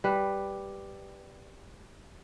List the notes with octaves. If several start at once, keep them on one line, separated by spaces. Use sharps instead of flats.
G3 B4